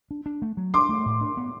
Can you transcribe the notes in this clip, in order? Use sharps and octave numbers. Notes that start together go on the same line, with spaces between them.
D4
D4
A3
F#3
D4 C6 D6
A3
A2
D4
B3